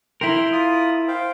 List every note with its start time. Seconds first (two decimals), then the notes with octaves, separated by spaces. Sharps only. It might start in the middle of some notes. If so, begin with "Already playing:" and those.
0.21 E4 A#4 G5 C6
0.52 F4 D#6
1.08 C5 F5 G5